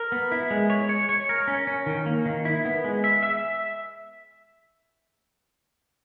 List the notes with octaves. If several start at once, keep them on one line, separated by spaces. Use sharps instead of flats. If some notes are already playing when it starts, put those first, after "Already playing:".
Already playing: A#4
B3
E4
G#3
C#5
C#5
C#5
A#4
C#4
C#4
D#3
A#3
D#3
E4
B3
G#3
E5
E5